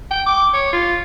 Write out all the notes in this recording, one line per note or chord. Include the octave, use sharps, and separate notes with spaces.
G5
D6
C#5
F4